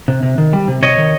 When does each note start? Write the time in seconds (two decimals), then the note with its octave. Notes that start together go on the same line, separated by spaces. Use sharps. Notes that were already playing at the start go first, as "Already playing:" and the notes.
0.08 C3
0.23 C3
0.38 D#3
0.53 G3
0.68 C3
0.82 C3 C#5 D#5
0.98 D#3